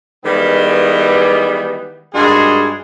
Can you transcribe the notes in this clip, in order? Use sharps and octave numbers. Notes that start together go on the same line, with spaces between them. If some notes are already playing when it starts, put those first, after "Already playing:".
D#3 E3 G3 G#3 B3
G2 D#3 G#3 F#4 G#4 C6